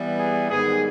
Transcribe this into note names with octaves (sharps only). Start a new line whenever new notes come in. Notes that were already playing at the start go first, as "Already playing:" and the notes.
Already playing: E3 G3 B3
G#4
G#2 D#3 G3 B3 G#4